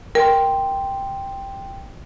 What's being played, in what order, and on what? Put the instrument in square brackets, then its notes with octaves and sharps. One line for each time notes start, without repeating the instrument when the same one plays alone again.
[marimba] A#4 [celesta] G5 C6